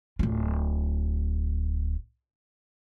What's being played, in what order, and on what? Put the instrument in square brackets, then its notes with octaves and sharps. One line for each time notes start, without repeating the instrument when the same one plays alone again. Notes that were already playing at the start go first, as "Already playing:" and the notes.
[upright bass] D1 F4